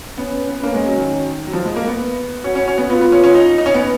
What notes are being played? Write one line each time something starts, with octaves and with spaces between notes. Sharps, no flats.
B3 C#4
B3
A#3 C#4
G#3
F#3
D#3
F#3
F3
G#3
A#3
B3
C#4 F#4
C#4
C#4
B3
B3 F4
B3
C#4
C#4
D#4
D#4
C#4
B3